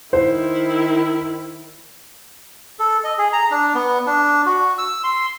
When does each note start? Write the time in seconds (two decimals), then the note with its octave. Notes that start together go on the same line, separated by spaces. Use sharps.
0.13 D#3 E4 C5
2.79 A4
3.04 D#5
3.18 G#4
3.33 A#5
3.51 D4
3.74 B3
4.06 D4
4.46 F#4
4.78 E6
5.04 C6